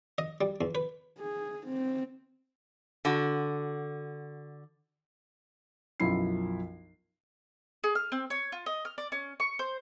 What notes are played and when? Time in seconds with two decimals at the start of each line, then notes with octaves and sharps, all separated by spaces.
0.18 D#5
0.41 G3
0.61 E2
0.75 B4
1.19 G#4
1.67 C4
3.05 D3 F#4
6.00 B1 F#2 F3 E4 F4 C7
7.84 G#4
7.95 F6
8.12 C4
8.30 C#5
8.52 F4
8.66 D#5
8.85 F6
8.98 D5
9.12 C#4
9.40 C#6
9.59 C5